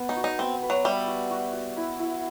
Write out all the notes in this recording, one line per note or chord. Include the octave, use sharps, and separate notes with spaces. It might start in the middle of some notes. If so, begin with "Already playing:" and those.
Already playing: B3
D#4
F#4
D#4
B3 C4
B4
F#3
G3 E5
F#4
F#4
F#4
E4
E4